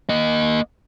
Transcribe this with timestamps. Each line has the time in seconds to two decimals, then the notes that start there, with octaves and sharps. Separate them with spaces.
0.09 A#3 D#5